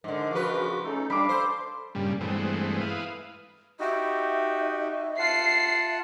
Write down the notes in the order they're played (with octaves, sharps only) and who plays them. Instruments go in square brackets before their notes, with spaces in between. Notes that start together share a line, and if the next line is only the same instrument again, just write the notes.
[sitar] G#2 D3 [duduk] A#4
[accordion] C#3 F#4 D6 [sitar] F3 B4
[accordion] A3 D#4 A4 [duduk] C#4
[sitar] G3 [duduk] D4 [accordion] F5 [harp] B5 D6
[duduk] A4 [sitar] C5
[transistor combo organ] G2 A#2 C#3 G3
G2 E3 G#3 A3 B3 C4
E4 B4 F5 D#6
[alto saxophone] D#4 [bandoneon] F#4 G4 [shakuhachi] E5
[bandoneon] F4 F#5 A5 [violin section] C7